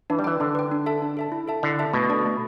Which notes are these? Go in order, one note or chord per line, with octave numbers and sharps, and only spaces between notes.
E3 D4
G3
E3 B4 G5
D3 D4
B4 G5
D4
A4 E5 A5
D4
A4 E5 A5
E4
A4 E5 A5
D3 E4
A4 E5 A5
B2 A3
D4 A4 D5
A3